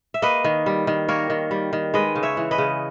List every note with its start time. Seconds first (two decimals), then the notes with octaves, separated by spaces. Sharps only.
0.14 E5
0.22 A#3 B4 D#5
0.44 D#3
0.66 G3
0.87 D#3
1.08 A#3 A#4 C#5
1.30 D#3
1.51 G3
1.73 D#3
1.94 G#3 B4 D#5
2.15 C#3
2.23 C#5 E5
2.37 E3
2.51 B4 D#5
2.58 C#3